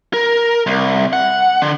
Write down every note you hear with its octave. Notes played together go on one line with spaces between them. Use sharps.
A#4
C2
F#5
D3